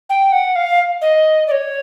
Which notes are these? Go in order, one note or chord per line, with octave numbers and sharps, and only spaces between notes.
G5
F#5
F5
D#5
D5
C#5